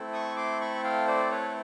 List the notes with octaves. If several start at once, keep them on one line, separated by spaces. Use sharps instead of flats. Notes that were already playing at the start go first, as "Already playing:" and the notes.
Already playing: A3 C4 E4 A4
C#6 D#6
C6 D6
B5 C#6
F5 G5
C5 D5
B4 C#5